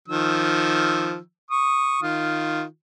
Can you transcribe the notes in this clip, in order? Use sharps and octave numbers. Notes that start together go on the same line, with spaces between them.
D#3 F3 E6
C#6 D#6
D#3 F4